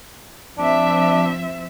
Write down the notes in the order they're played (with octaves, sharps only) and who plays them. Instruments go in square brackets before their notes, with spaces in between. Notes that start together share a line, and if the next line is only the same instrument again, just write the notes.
[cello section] F3 C4 E5 [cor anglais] D4